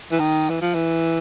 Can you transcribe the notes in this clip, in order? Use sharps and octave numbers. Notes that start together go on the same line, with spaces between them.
E3
D#3
E3
F3
E3